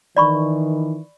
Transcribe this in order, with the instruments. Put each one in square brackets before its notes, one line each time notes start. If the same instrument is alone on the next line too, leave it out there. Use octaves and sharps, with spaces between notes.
[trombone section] D#3 E3 [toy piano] D5 B5 C#6